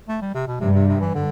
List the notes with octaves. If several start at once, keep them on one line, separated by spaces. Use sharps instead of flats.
A3
G3
C3
B2
G2 C3
C3
C3
E3
D3